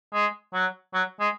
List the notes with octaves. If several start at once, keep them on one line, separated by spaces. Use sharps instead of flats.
G#3
F#3
F#3
G#3